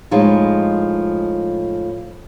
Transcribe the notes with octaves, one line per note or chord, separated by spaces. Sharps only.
A2 F3 G#3 D#4